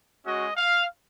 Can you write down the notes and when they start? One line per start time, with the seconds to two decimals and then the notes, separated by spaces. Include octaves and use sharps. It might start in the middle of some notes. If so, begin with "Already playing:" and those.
0.25 G#3 C#4 F#4 D#5
0.57 F5